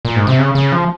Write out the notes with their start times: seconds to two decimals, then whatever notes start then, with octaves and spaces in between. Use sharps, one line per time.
0.05 A#2
0.16 G#2
0.27 C3
0.39 C#3
0.55 C#3
0.72 F3